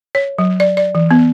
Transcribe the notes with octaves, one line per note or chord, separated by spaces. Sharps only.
C#5
F#3
D5
D5
E3
B3